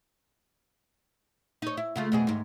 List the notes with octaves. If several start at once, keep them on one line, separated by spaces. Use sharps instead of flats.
D#4 C#5
E4
C#3 A3 F4
F2 B2 G#4
D#2 G#2